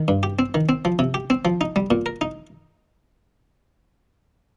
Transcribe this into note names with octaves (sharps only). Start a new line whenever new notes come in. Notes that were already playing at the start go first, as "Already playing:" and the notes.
Already playing: D#3
G2
G4
C4
D#3
C4
F3
C3
G4
C4
F3
D#4
G3
A#2
A#4
D#4